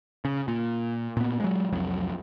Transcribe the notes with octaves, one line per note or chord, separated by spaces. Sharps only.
C#3
A#2
A#2 B3
F#3 G#3
C2 F2 F#3